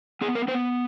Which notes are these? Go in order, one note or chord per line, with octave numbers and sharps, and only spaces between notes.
B3 G#4
A#4
B3 C5